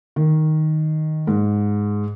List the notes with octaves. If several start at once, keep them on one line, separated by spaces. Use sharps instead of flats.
D#3
G#2